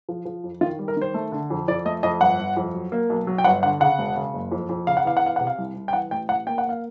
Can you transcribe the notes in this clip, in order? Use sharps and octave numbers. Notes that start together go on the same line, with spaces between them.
F3
F3
F2
D#3 F4
G3
A#4
D#3 C5
A3
D3
F2
F2 D5
A3 D#5
F2 D#5
G1 F#5
G1
F2
F#3
A#3
B1
F#3
G5
G1 F#5
D3 F#5
C#3 F#5
E1
C#3
F#1
F2
F2
C#3 F5
F#5
E2 F5
F#5
E2 F5
C3 F#5
F5
C2
C2
G5
E3 F#5
A1 G5
A1 F#5
A#3 G5
F#5
A#3 F5